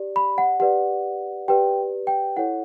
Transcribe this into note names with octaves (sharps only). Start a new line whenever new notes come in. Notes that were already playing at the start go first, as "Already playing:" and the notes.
Already playing: G4 D5
B5
F#5
G4 B4 D5 F#5
G4 B4 D5 G5
G5
E4 A4 C#5 F#5